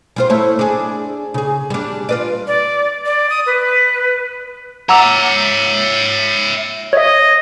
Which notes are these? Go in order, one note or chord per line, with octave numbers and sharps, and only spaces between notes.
G3 F4 C5
A3 E4 C#5
D4 G#4
C#3 G#4
G3 D4
F4 B4 D5
D5
D5
D#6
B4
C#5 E5 F#5 A#5 D6 E6 F7
C#5 D#5 E5